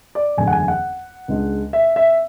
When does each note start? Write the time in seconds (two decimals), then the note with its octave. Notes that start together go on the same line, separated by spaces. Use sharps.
0.15 D5
0.37 F#1 E2 D3 A3 G#5
0.47 F#5
0.52 G#5
0.68 F#5
1.28 C#2 C#3 G#3 D4
1.73 E5
1.96 E5